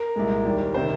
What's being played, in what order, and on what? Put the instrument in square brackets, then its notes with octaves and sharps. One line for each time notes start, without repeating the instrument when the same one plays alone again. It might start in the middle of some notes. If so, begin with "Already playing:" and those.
Already playing: [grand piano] A#4
C2 A#2 G#3
D#2 D#3 G3
C3 D#3 C5